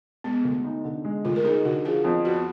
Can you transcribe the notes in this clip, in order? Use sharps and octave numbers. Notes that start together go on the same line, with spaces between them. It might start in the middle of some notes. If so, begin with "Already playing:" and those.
G#3 B3
D2
D#4
D3
G#3
D2 F4
A#4
D#4 G#4
D3 F#4
F3 G#4
F2
B3 F#4